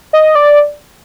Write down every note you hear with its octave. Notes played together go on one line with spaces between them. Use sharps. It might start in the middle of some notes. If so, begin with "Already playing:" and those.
D#5
D5